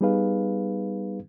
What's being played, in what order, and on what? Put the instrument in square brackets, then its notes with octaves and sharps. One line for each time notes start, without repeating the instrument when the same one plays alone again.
[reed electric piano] G3 B3 D#4 G#4 B4 F5